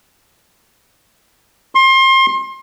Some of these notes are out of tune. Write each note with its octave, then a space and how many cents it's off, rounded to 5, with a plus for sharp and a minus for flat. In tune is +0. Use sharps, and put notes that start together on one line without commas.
C6 +30